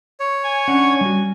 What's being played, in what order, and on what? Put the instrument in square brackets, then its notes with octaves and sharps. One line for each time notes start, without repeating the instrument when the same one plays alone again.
[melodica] C#5
[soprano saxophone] G#5
[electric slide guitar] C#4 D4 F#5
G3 F#4